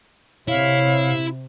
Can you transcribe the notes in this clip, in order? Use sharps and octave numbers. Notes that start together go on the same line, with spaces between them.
C3 E4 C#5 F5